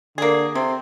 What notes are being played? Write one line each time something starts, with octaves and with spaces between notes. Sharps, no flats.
D3 A#3 G#4
C3 C4